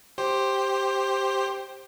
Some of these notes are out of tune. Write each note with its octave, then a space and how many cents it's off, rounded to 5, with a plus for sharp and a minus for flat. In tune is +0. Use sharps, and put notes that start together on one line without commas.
G4 +0 C5 +10